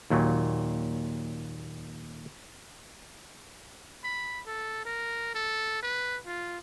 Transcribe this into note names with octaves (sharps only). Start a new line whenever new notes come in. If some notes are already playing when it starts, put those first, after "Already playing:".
D#2 A#2 F#3
B5
A4
A#4
A4
B4
F4